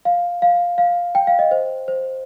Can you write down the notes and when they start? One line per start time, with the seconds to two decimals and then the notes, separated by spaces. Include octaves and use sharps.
0.05 F5
0.42 F5
0.78 F5
1.15 G5
1.27 F5
1.39 D#5
1.51 C5
1.88 C5